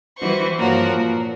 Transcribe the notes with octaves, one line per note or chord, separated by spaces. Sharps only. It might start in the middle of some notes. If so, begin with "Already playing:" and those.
E3 G3 F#4 C5 C#6
G2 F3 A#3 F#4 A#4 C#5
A#2